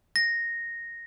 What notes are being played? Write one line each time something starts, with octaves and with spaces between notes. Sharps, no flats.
A#6